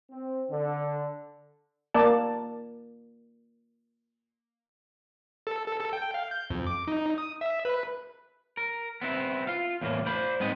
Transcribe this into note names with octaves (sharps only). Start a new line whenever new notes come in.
C4
D3
A#3 D5 A5
A4
A4
A4
G5
F5
G6
F2
D6
D#4
D#6
E5
B4
A#4
B3 C4 E4
F4 F5
E2 A2 A#3
C5 D5 B5
G#2 B3 C4 D#5